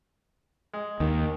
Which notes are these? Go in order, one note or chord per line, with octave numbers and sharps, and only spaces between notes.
G#3
D#2 D#3